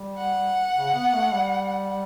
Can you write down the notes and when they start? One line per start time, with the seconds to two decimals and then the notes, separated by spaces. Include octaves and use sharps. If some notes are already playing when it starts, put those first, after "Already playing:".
Already playing: G3
0.18 F#5
0.75 C#3
0.94 B3
1.14 A3
1.33 G3